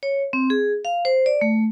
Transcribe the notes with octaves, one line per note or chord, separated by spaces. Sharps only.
C#5
C4
G#4
F5
C5
D5
A3